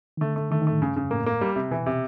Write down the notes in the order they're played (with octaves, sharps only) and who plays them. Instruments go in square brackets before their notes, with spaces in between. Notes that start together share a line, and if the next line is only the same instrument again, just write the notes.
[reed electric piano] D#3
[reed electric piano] D3 [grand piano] A3
[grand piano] A3
[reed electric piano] D#3 [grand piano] A3
[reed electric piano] D#3
[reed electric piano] A2 [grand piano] A3
[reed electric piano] G2 [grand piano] C#3
[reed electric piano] F2 [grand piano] C#3
[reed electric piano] A2 [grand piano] A#3
[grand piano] A#3
G3
C3
[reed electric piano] B2 [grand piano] E3
[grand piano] C3